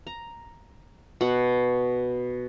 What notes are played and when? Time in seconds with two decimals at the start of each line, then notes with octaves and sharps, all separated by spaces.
0.07 A#5
1.21 B2 F#5